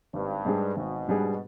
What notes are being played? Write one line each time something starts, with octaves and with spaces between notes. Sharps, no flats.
G#1 G2
G#2 G3 D4 G#4
G#1 B2
G#2 G3 D4 G#4